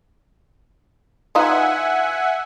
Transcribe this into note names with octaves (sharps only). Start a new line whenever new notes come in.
E3 D#4 F4 E5 F#5 G#5